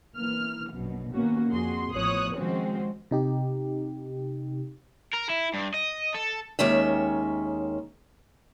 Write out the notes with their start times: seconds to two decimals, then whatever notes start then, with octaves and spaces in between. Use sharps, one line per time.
0.16 E3 A#3 F6
0.71 A#1 F#2 B2
1.12 D#3 A#3 B3 C#4 F#4
1.50 F2 F#4 G#4 C6
1.92 A1 F3 B3 C#5 D#6 F#6
2.37 D#3 F3 G#3 C4 C#4 F#4
3.11 C3 D#4 G4
5.13 A#4
5.29 E4
5.54 G2
5.74 D#5
6.15 A4
6.59 D#2 D#3 G#3 C#4 C#5 E5